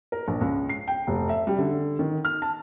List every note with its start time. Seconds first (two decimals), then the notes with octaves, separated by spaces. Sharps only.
0.12 A#4
0.28 A#1
0.41 C#2
0.69 C7
0.88 G5
1.07 F1
1.29 E5
1.47 G3
1.59 D3
1.99 D#3
2.25 F6
2.42 A5